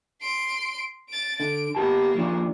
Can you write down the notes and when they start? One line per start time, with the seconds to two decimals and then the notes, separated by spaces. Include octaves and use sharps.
0.21 C6 D7
1.09 A6 D7
1.40 D3 D7
1.75 A#3 B3 G4 A5
2.14 D#2 F3 D4